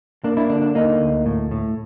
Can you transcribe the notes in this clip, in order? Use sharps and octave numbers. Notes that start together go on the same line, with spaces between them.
A#3 D4
D4 E4
D3 D4
D4
A#3 D#4
D2
A2
A2